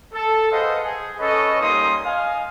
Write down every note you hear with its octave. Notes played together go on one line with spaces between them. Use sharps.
A4
G#4 B4 C5 D#5 F5 F#5
G#4
C#4 A4 B4 C#5 D#5
G3 A#3 C#4 D#4 C6 D#6
D#5 F5 G#5